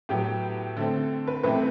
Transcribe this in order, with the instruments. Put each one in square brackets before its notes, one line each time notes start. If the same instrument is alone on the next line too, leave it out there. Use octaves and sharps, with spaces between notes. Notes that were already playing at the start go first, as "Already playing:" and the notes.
[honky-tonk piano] A2 F#3 B3 G4
D3 A3 C4 A4
B4
C3 E3 A3 C4 B4